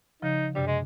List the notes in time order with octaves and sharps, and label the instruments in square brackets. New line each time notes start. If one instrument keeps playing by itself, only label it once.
[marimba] C#3 F3 [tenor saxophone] D#4
[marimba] F#2 C3 D4 [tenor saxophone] G3
[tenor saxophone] G#3